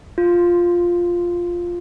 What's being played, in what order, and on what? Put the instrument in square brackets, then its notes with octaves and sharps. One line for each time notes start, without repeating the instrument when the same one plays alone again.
[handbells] F4